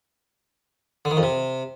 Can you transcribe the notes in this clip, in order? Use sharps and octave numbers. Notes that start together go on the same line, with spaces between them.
D3
D#3
F2
C3